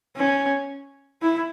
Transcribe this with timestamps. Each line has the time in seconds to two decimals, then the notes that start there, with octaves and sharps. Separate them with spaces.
0.17 C#4
1.22 E4